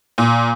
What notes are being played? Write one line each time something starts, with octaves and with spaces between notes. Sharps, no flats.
A#2